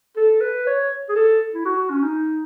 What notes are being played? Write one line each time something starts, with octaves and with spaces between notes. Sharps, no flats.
A4
B4
C#5
G#4
A4
E4
F#4
C#4
D#4